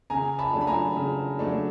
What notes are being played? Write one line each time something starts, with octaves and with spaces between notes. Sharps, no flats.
C#3 G#5 A#5
A5 B5
F#3 A3 D4
B5
G#5 A#5
C#3
F#3 A3 D4